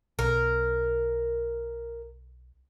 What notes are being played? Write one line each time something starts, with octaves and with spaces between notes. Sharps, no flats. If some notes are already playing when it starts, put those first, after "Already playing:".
B1 A#4